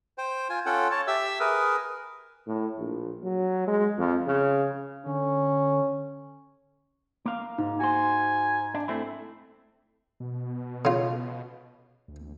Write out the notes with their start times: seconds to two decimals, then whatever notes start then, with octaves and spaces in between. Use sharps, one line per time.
0.18 C5 G5
0.50 F4 G#5
0.66 C#4 F4 A4 F#5 G5
0.91 C#5 A5
1.07 G4 E5 E6
1.40 G#4 A#4 B4
2.47 A2
2.79 A#1
3.23 F#3
3.67 G#3
3.98 F2
4.27 C#3
5.06 D3 C#4
7.26 A#3 F5
7.58 G#2
7.80 F#4 C5 G#5
8.74 D4
8.88 A3 C4 E4
10.20 B2
10.85 C#3 F4
12.08 D2